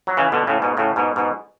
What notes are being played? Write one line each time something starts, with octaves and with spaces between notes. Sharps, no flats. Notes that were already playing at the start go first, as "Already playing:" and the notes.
F#3
C#3 E3
B2 D3
A2 C#3
G#2 B2
A2 C#3
G#2 B2
G#2 B2